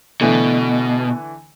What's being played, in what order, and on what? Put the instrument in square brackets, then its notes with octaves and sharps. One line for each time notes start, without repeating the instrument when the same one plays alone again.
[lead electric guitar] B2 [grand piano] D3 E3 A3